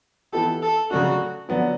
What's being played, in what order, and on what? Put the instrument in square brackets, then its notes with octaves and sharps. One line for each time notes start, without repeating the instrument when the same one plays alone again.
[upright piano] E3 B3 E4 G4 [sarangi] A4
[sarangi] A4
[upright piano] C#3 F#3 A3 D4 [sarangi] F#4
[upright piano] D3 F#3 B3 D4